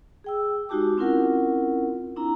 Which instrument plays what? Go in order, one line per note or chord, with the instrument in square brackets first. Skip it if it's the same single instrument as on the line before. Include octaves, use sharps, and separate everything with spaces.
[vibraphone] G#4 G5 E6
G#3 D#4 F#4 G4 A5 D6
C4 C#4 E4 F4 A#4 F#5
C4 D4 E4 A#5